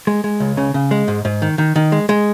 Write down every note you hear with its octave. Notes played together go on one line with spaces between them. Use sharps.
G#3
G#3
C#2
C#3
C#3
G#3
G#2
G#2
D#3
D#3
D#3
G#3
G#3